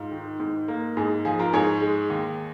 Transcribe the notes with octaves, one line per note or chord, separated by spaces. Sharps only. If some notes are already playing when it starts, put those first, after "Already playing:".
Already playing: G#2 F4
D#3
G#2
A#3
G#2 G#4
F3 G#4
F4 A#4
G#2 G#4 C#5
G#3
D#2